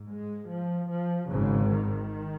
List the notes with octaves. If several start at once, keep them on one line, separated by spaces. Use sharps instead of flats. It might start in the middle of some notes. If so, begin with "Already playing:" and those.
Already playing: G#2
G#3
F3
F3
G#1 G#2 C#3
D#3